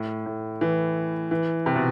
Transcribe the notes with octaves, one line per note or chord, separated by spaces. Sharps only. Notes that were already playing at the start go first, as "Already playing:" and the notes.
Already playing: A2
A2
E3
E3
C3
B2